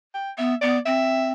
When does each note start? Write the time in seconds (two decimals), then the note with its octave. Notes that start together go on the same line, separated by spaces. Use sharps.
0.14 G5
0.38 B3 E5
0.62 B3 D5
0.86 C4 E5